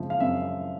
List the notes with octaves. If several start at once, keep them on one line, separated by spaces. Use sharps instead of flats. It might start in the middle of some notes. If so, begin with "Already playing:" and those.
Already playing: F#2 C#3 F3 G#3 E5
F5
F#2 E5